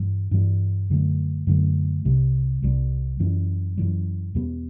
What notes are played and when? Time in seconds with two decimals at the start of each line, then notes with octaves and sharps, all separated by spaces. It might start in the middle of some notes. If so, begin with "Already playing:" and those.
Already playing: G2 E3 G3
0.31 G2 E3 G3
0.90 F#2 D3 A3
1.47 F#2 D3 A3
2.05 C2 C3 G3
2.62 C2 C3 G3
3.20 F#2 E3 G3
3.77 F#2 E3 G3
4.35 E2 B2 G3 B3